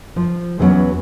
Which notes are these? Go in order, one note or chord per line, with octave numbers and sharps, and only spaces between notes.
F3
E2 E3 F#3 G3 B3 C#4